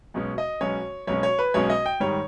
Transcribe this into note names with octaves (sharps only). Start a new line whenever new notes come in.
B1 B2 G#3 C#4
D#5
B1 B2 G#3 C#4 C#5
B1 B2 G#3 C#4 C#5
C#5
B4
B1 B2 G#3 C#4 C#5
D#5
G5
G#2 D#3 G3 C#5